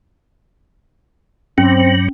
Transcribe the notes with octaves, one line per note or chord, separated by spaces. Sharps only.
G2 F#3 C4 C#4